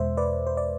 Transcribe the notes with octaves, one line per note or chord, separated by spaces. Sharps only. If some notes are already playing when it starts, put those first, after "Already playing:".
Already playing: E2 B2 G#3 C5 E5
B4 D5
C5
D5